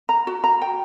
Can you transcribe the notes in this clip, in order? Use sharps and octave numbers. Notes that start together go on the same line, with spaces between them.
A#5
F#4
A#5
G5